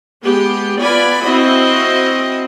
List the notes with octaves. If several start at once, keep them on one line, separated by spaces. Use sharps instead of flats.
G#3 B3 G4
B3 F4 D5 G#5 B5
C4 E4 F#4 D#5